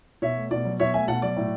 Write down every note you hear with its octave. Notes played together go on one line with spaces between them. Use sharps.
B2 C#5 E5
A3
B2 D5
F#3
B2 C#5 E5
A3 E5 G#5
B2 F#5 A5
F#3 D5
A2